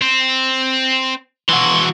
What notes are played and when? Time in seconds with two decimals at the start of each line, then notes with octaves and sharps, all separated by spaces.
0.02 C4
1.49 E3 F#4 C6